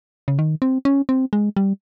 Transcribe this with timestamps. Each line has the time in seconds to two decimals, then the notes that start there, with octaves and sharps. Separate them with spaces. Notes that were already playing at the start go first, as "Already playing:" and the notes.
0.28 C#3
0.39 D#3
0.62 C4
0.85 C#4
1.09 C4
1.33 G#3
1.57 G3